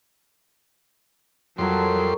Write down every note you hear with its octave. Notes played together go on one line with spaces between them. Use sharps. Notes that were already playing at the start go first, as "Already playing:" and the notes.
F2 F#3 G3 A4 A#4 C#5 C6